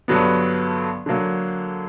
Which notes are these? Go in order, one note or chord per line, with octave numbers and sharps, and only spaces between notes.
G2 D3 F#3 B3
D3 F#3 A#3